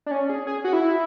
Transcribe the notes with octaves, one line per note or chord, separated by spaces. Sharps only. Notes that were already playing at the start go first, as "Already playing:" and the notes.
D4
C#4
G#4
G#4
F#4
E4